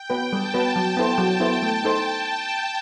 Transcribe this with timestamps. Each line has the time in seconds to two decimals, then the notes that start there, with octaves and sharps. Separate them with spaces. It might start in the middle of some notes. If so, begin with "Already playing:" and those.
Already playing: G5
0.10 B3 F#4 B4
0.32 G3 A5
0.54 B3 F#4 B4
0.76 F#3
0.97 B3 E4 A4 C5
1.18 F#3
1.40 B3 E4 A4 C5
1.63 A3
1.84 D#4 A4 C5